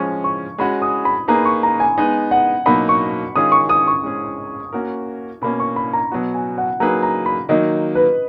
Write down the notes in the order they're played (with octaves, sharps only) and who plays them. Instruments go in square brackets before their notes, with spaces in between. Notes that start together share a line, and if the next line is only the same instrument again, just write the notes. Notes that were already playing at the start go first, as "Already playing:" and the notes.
Already playing: [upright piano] F3 G#3 C#4 [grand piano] C#6
[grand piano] C#6
[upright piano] G#3 C#4 F#4 [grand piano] B5
[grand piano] D#6
B5
[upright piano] A#3 D#4 G#4 B4 [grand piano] A#5
[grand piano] C#6
A#5
G#5
[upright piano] G#3 B3 D#4 [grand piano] G#5
[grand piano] F#5
[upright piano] B2 F#3 A#3 D#4 F#4 [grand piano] B5
[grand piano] C#6
[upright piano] D#3 G#3 C#4 F4 G#4 [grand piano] D#6
[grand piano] C#6
D#6
C#6
[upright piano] G#3 C#4 G#4
A#3 C#4 F#4 A#4
[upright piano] B2 A#3 C#4 [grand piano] B5
[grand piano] C#6
B5
A#5
[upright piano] B2 F#3 B3 F#4
[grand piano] G#5
F#5
[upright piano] F#3 A#3 D#4 G#4 B4 [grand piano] A#5
[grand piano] A#5
B5
[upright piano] D#3 F#3 A#3 D#4 [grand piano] D#5
[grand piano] B4